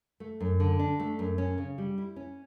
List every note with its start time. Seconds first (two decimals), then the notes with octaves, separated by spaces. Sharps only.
0.20 A3
0.40 F#2
0.60 D3
0.79 D4
1.00 A3
1.19 F#2
1.38 C#4
1.58 C#3
1.78 G3
1.98 E4
2.16 C#4